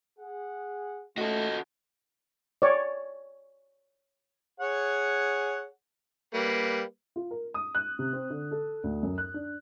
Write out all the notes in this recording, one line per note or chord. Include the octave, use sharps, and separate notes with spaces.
G#4 F#5
A3 C#4 F4 F#4 A4 D#5
C#5 D5
G#4 C#5 F#5
G3 A#3 B4
F4
A#4
D#6
F#6
C3
C4
D3
A4
D2
F#2
F#6
D4